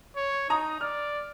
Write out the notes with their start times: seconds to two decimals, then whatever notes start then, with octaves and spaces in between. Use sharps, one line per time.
0.16 C#5
0.50 D#4 A#5 D#6
0.81 D5 F6